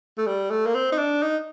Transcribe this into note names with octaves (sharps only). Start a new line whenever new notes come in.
A3
G3
A3
A#3
C4
D#4
D4
D#4